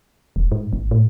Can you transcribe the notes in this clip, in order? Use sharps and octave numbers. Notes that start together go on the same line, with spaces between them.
E1
G#2
G#1
A2